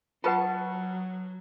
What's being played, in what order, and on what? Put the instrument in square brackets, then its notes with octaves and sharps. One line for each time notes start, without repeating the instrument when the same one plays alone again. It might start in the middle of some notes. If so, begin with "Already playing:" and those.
[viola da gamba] F#3 [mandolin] B3 A5 C#6 [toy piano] F4 B4 F#5